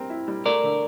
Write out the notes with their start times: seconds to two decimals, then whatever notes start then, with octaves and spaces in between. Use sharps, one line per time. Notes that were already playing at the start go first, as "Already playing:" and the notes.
Already playing: G3 C4 A#4
0.10 E4
0.28 G3
0.46 A3 A#4 D5
0.64 D3